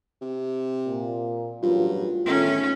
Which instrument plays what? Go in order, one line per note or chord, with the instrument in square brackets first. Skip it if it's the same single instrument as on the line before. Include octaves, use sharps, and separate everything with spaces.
[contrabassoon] C3
[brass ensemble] A#2
[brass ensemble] A1 A#2 F#3 [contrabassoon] G2 [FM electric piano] F4
[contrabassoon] E2 [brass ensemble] A2 D#3 A3 [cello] C#4